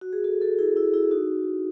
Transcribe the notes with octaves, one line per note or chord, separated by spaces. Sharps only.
F#4
G#4
F#4 A4
F#4 A4
E4 G#4
E4 G#4
E4 G#4
D#4 F#4